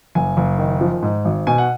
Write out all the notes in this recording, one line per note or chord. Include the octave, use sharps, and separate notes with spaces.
F#1 G#5
F#1
D#3
F3
G#2
G#1
B2 G#5
F#5